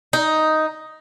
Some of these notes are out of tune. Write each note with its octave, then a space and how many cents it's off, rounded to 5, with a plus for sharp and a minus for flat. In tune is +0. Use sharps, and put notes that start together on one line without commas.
D#4 +5